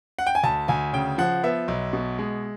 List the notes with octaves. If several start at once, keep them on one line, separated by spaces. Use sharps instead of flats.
F#5
G5
G#5
D2 A5
D2 G#5
C#3 G5
F3 F#5
B3 E5
B1
B2
G#3